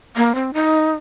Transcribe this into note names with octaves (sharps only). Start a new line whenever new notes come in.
A#3
C4
D#4